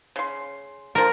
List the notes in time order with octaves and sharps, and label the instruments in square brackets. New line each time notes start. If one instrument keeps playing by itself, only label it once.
[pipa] C#3 C6
[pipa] D3 F3 [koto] A#4